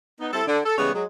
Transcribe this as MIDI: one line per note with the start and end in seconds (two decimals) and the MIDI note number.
0.20 0.30 59
0.20 0.30 63
0.33 0.43 55
0.33 0.43 60
0.33 0.43 64
0.33 0.43 69
0.47 0.60 50
0.65 0.77 69
0.78 0.94 49
0.78 0.94 52
0.78 0.94 55
0.78 0.94 56
0.78 0.94 59
0.78 0.94 73
0.94 1.03 54
0.94 1.03 56